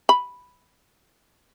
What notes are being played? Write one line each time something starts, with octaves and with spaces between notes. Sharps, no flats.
B5